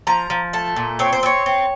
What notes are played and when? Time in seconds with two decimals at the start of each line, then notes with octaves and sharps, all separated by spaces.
0.07 F3 A#5
0.30 F3
0.53 A3 A5
0.76 A#2
0.99 C4 C#5
1.13 C5
1.23 C4 C#5
1.46 C4